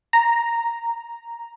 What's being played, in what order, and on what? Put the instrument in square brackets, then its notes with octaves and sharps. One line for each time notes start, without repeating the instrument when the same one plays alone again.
[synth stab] A#5